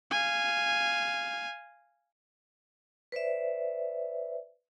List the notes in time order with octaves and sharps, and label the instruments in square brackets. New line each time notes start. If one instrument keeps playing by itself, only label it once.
[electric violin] F5 G#5
[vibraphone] B4 C5 D5 E5